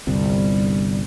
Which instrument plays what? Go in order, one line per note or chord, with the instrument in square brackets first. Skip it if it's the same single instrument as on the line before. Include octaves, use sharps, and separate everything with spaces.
[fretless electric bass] G1 C2 C4 [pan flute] G3